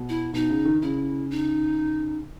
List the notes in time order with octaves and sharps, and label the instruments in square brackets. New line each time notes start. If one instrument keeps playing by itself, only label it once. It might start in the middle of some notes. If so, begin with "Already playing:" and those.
Already playing: [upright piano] B2
[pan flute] E4
[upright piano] B2 [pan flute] D#4
[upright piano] C#3
D#3
[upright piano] C#3 [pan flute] E4
[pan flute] D#4